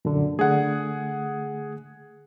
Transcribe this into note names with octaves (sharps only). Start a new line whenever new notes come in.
F#2 A#2 D3
D3 A3 G#4 F#5